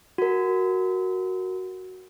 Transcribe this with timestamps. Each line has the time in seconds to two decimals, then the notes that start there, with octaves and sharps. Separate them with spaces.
0.18 F#4 A#4